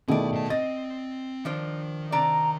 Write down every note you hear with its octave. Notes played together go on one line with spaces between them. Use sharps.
B2 D#3 A3 E4 G#4 D5
A2 A5
C4 D#5 A6
D#3 F3 D4 C5
C3 D4 D5 A#5